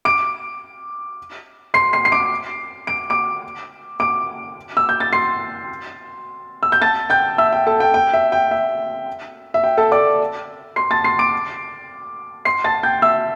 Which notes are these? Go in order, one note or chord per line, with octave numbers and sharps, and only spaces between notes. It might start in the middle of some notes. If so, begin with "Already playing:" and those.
D6 D7
C6 C7
C6 C7
C7
D6 D7
D7
D6 D7
D6 D7
E6
G6
A6
C6 C7
E6
G6
A5 A6
G5 G6
E5 E6
G5
A4 A5
G5
G5
E5
G5
E5
E5
G5
A4 A5
D5 D6
C6 C7
A5 A6
C6 C7
D6 D7
C6 C7
A5 A6
G5 G6
E5 E6